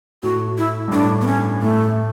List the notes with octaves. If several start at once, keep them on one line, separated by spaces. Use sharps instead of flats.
A2 F#4
E4
G2
A2 D4
B3
C#4
A2 A3